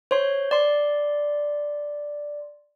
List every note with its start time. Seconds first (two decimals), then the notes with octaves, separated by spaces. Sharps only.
0.11 C5 C#5 C6
0.51 D5 C6